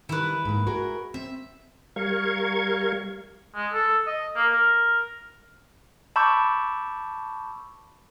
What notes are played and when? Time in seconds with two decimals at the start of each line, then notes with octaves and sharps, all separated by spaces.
0.09 D#3 G3 E4 B4
0.45 G#2 A#3
0.67 F#4 G#4 A#4
1.14 C4 E5
1.96 G3 A#4 F5 C#6 G#6
3.55 G#3
3.73 A4
4.06 D#5
4.36 A#3
4.53 A#4
6.16 A5 B5 C#6 D6 E6 G6